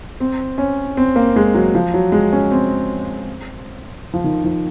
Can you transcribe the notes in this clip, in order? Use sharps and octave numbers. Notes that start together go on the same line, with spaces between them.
C4
C#4
C4
A#3
G#3
F#3
F3
F#3
G#3
C#4
C4
F3
D#3
F3